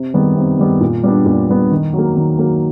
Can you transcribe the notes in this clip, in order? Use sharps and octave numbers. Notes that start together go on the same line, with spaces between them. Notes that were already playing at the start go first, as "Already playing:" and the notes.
Already playing: C3
D#3 G3 B3
C3
D#3 G3 B3
A#2
G3 B3 D4
A#2
G3 B3 D4
D#3
F#3 A#3
D#3
F#3 A#3